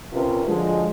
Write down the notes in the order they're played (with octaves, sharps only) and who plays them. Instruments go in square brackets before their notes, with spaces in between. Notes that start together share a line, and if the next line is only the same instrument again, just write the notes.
[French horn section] C3 C#4 F4 A#4 B4
D3 F3 F#3 G#3